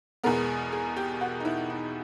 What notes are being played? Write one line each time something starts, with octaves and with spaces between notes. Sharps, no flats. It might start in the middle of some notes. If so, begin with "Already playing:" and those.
E2 B2 G#3 B3 A#4
G#4
G4
F#4
D#4
E4
D#4